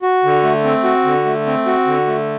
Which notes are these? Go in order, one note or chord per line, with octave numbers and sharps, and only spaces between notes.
F#4
D3
A3
C4
F#4
D3
A3
C4
F#4
D3
A3